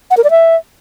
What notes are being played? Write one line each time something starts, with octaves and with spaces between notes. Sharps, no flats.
F#5
A#4
D5
E5